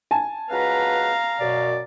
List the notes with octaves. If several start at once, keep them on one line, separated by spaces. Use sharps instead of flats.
G#5 A5
C#2 F#4 B4 F5 A#5
F#2 B2 D5